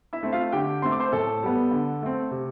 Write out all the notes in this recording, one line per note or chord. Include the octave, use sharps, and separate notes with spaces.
E4 E5
A3 C4
F4 F5
D3 G4 G5
A3 C4 C6
D6
C5 C6
A2 A4 A5
G3 B3
D3
A3 C4
C3